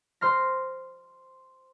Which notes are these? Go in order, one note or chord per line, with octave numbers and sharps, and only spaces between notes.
C5 C6 F6 A#6